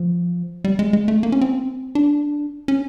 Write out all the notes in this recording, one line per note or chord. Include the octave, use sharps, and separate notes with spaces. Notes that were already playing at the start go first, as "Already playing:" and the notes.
Already playing: F3
G3
G#3
G#3
A3
A#3
C#4
C4
D4
C#4